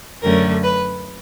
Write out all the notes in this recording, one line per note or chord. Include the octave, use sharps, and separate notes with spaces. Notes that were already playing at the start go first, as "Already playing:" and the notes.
F#2 D3 F#3 A3 C#4 A#4
B4